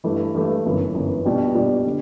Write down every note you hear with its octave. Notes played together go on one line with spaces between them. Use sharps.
G2 E3 A3 E4
G2 E3 A3 E4
G1 F#2 E3 B3
G1 F#2 E3 B3
B2 G3 D4 G4 D5
B2 G3 D4 G4 D5
D3